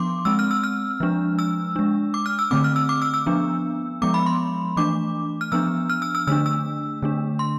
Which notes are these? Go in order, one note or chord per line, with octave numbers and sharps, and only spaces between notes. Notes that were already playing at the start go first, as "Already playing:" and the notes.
Already playing: F3 B3 D4 C6 D6
G#3 C4 E6
F6
E6
F6
F3 G#3 D4
E6
G#3 D4
D6
F6
E6
D3 A3 C4 D6
F6
E6
D6
E6
E6
F3 B3 D4
F3 G#3 B3 D6
B5
C6
E3 A3 D4 D6
F6
F3 B3 D4 E6
F6
E6
E6
D3 A3 D4 E6
E6
D3 A3 D4
C6